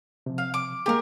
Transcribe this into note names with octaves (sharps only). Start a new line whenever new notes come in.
C3 F3
F5
D6
G#3 A#3 G4 G#4 A#4